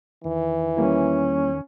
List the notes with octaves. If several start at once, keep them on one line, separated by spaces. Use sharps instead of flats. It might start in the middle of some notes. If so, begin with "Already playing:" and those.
E2 D#3 E3
G3 A#3 C#4 E4